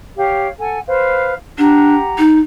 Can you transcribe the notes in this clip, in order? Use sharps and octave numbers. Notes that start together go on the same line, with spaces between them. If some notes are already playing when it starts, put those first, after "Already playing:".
G4 C#5 F5
A4 F#5 G#5
B4 C5 F5
D4 G4 F#5 A#5
D#4